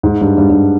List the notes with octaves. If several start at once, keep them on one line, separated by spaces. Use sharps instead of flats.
G#2
G2
G2
G2